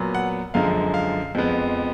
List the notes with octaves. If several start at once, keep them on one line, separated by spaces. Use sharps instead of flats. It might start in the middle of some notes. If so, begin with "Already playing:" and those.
Already playing: A#2 F#3 B3
F#5
F#2 D3 F3 G#3 F5
F5
F2 F3 G#3 B3